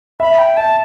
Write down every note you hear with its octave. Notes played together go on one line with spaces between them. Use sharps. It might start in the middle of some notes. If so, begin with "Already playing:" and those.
E5 B5
G5
E5 A5